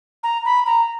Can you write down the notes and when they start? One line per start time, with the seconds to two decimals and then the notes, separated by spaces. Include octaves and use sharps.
0.23 A#5
0.45 B5
0.66 A#5